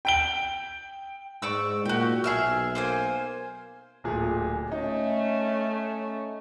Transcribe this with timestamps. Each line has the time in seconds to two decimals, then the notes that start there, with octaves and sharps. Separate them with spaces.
0.05 G5 D7 G7
1.42 G#2 D5 C#6 E6
1.85 A#2 F#4 G4
2.24 B1 G#4 E5 F6
2.75 A#3 C5 G#5
4.04 D1 A#2 G#4
4.72 A3 C#4 D#4